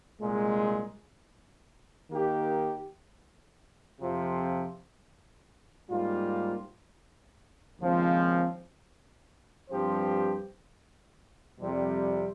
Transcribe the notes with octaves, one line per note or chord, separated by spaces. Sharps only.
C2 A#2 G#3
D#3 A#3 D#4 G4
F2 C3 F3 C4 F4
G#2 G3 A#3 F4
D#2 C#3 F3 G#3 C4
G2 F3 C4 G4 C5
F2 C3 G3